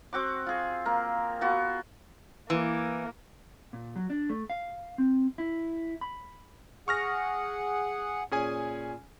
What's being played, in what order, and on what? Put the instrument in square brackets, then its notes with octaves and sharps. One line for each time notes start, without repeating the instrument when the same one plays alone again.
[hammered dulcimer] C4 F#4 D6
F4 G#4
A#3 A#4
B3 F4 F#4
[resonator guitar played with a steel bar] E3 [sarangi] A#3
[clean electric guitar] A#2
F#3
D4
A3
F5
C4
E4
B5
[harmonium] G#4 F#5 [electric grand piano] C#6 F6 A#6
[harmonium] A#2 [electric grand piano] C#4 G#4 G#5